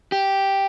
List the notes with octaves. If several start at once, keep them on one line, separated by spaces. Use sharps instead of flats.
G4